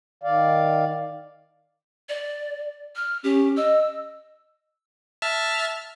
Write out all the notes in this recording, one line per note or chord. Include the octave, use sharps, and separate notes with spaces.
D#3 D5 F5
D5
F6
C#4 G4
D#5 E6
E5 A5 F6